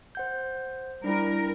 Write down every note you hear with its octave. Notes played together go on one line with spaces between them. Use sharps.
C5 F#5 G6
G3 D4 E4 A#4